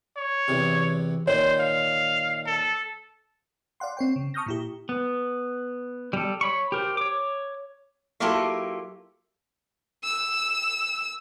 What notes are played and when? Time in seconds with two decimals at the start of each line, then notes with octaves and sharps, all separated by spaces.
0.17 C#5
0.48 E2 C3
1.27 A#2 D#3 C5 C#5
1.60 F5
2.46 A4
3.80 D5 F5 F#5 C6
3.97 C4 C#5 G5
4.16 C#3
4.34 A5 C#6 D#6 F6 G6 A#6
4.46 A#2 E4 G4
4.89 B3
6.13 G3 A4
6.41 C#5 B5 C#6
6.72 G4 A#4 C5
6.97 C#5 D6
8.20 F#3 A#3 E4 F4 G4 A4
10.04 E6